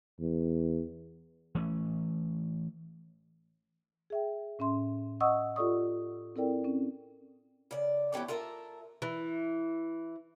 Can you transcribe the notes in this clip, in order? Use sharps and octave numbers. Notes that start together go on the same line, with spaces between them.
E2
E3 A3 C#4
G#4 E5 G5
A2 C#4 E5 C6
D#5 E5 F#5 C#6 D#6 E6
F4 G4 A4 D5 C#6 D#6
C4 E4 A4 A#4 D5 G5
C4 C#4
C#3 D5
E3 B3 C#4 G4 A4
F4 A4 A#4 E5
E3